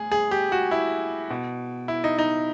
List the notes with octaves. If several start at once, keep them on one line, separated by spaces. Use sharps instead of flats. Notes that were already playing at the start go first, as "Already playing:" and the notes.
Already playing: A2 G#4
G#4
G4
F#4
E4
B2
E4
D#4
D#4